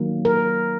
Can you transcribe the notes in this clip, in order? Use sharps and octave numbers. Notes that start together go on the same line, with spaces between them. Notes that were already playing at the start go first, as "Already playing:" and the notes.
Already playing: D#3 F#3 A#3
A#4